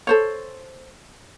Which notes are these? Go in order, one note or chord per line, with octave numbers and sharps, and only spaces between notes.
A4 C5 C#5